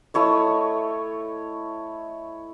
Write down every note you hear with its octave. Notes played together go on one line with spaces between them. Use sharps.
A3 E4 C#5 D#5